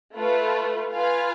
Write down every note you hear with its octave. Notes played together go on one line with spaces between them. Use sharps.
A3 F4 B4
F4 B4 F5 G#5